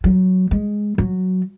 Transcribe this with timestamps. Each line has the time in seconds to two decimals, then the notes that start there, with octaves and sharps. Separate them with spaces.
0.04 F#3
0.51 G#3
0.98 F#3